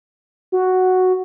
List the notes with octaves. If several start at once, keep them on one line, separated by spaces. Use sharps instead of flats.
F#4